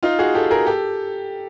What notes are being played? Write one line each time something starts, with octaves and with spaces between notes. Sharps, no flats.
D#4 F4
F#4 G#4
G4 A4
G#4 A#4
G4 A4